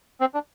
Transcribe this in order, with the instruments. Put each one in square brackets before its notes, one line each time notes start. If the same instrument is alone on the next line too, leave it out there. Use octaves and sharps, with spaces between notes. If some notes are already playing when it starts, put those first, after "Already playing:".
[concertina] C4
D4